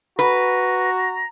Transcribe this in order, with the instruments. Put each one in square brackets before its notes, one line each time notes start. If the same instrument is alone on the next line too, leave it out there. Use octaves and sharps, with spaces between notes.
[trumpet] F#4 [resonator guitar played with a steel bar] B4 [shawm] A#5